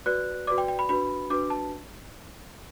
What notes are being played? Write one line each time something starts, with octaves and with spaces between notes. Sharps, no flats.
F#4 B4 D5 F#6
F#4 B4 D5 D6
G5
G5
B5
D4 F#4 B4 B5
D4 F#4 B4 D6
A5